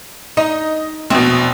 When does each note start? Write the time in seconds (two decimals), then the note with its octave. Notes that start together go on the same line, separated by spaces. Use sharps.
0.37 D#4 D#5
1.10 A#1 E2 B2 C4